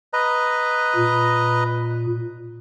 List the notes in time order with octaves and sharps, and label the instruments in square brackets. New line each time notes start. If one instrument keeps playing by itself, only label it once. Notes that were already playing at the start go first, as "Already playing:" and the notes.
[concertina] B4 D#5 A#5
[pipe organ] A#2